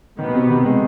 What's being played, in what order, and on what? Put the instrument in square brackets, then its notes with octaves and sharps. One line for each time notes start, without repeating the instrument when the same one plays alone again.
[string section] B2 B3 [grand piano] D#3
[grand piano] C3
D#3
G#3